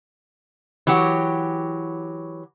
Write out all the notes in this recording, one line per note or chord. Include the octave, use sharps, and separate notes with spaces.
E3 F#3 G4 C#5 F#5